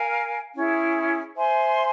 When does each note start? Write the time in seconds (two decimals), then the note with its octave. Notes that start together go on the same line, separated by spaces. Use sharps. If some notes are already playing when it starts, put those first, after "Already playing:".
Already playing: A#4 F5 G#5
0.55 C#4 E4 G#4
1.36 C5 E5 G#5 C6